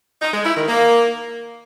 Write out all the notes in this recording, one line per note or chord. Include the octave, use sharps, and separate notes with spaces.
D#4
G#3
E4
D#3
A#3